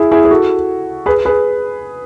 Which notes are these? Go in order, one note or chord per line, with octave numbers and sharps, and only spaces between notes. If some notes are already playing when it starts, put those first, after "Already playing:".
Already playing: E4 G#4
E4 G#4
G#4
F#4 A4
G#4 B4
G#4 B4